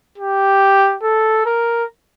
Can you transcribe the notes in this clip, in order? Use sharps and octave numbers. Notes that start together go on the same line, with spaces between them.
G4
A4
A#4